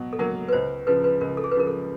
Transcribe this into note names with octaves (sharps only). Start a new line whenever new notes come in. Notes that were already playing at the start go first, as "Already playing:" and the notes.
Already playing: B2 F#3
A4
F#3 A#3 A#4
B4
C#2 C5
C#3 F3 B4
B4
C#2 A#4
A4
G#4
B4
C#3 F3 A#4
A4